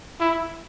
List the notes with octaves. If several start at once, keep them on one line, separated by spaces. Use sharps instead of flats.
E4